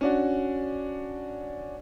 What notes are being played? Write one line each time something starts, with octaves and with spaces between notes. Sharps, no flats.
C#4 D4 F#4